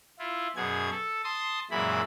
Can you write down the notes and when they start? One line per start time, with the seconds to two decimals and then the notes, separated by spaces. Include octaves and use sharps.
0.19 E4 F4
0.56 F#2 B2 G#4 G#6
0.91 A4
1.24 A5 C6 D#6
1.71 F#2 A#2 E3 G#3 E4 B5